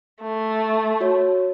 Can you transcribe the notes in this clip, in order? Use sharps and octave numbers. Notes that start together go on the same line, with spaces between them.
A3
F#4 C#5